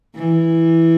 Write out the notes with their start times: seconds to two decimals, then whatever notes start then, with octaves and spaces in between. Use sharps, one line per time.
0.15 E3